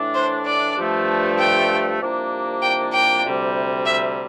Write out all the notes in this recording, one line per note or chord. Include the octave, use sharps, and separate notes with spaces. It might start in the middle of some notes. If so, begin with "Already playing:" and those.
Already playing: A2 E3 A3 D4
C5
D5
G2 F3 A3
G5
C2 C3 F3 A#3 D4
G5
G5
D2 C3 G3
E5